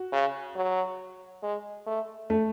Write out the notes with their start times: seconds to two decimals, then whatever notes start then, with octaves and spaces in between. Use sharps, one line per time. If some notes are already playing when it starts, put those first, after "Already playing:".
Already playing: F#4
0.13 C#3
0.56 F#3
1.43 G#3
1.87 A3
2.30 A3